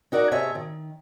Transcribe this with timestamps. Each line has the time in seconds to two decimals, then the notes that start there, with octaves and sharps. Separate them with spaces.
0.12 D#4 F#4 A#4 D5 F5 F#5
0.31 C3 G#4 C#5 D#5 E5 A5
0.55 D#3